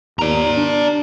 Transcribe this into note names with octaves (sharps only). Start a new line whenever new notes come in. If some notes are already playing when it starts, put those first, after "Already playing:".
D#2 D5 A#5
D4